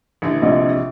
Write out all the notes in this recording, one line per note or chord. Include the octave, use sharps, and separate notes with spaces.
A1 D3 E3
A#1 C3 D#5